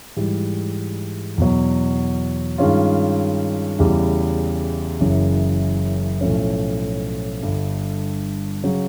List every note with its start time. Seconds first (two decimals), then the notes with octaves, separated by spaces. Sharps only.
0.16 G#2 E3 G3
1.38 E2 B2 F#3
2.58 G2 D#3 G#3 C#4 F4
3.79 E2 C#3 E3 G3
5.00 F#1 F#2 C#3 E3
6.21 B1 A2 F3 A3 C#4
7.42 G1 G2 D3
8.64 C#3 F#3